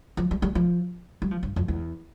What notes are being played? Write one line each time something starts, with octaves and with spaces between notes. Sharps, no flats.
F3
G3
G3
F3
G3
F3
G2
F2
E2